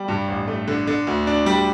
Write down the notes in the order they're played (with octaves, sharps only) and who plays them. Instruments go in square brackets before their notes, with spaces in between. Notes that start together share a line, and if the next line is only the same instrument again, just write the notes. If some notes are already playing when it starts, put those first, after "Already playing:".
Already playing: [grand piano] G3
G2
A1
A3
D3
D3
D2
D4
G3